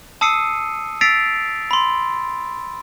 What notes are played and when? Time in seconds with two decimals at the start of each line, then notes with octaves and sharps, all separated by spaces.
0.21 A5 D#6 E6 C7 C#7 D#7
1.01 E6 A6 B6 C7 D7 F7
1.71 B5 C6